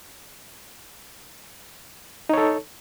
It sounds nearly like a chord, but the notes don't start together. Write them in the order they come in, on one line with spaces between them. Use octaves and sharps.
D#4 C#5 A4